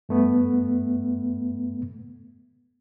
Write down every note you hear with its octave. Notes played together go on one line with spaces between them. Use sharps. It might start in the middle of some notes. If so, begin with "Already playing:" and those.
G2 A3 B3